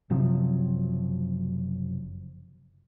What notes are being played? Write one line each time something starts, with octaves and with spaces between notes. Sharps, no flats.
F#1 C3 F3 F#3